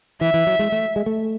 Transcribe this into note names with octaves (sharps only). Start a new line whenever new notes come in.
E3 E5
E3
F#3
G#3
A3
G#3
A3